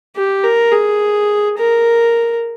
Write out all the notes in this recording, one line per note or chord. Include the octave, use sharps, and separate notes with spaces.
G4
A#4
G#4
A#4